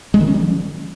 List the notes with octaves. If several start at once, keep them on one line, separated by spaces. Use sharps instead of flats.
G#3
D#3
C#4
G3
F3